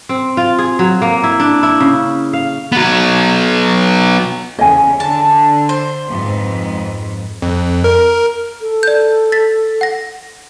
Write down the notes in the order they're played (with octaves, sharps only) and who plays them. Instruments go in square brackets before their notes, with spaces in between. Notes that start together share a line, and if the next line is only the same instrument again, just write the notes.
[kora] C4
F4
G#4
F#3
A#3
E4
D4
E4
C#3
F5
[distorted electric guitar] F#3 B3
[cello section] E2 C#3 C#4 [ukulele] D#5 G#5
[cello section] D3 [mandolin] A5
[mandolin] C5
[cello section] F2 G#2 B3
[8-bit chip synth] F2
A#4
[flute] A4
[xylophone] D5 G6
A6 B6
F#5 A#6